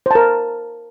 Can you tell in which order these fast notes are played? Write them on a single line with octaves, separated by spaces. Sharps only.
C5 A5 A#4